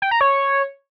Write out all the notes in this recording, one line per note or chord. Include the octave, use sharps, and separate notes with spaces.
G5
A#5
C#5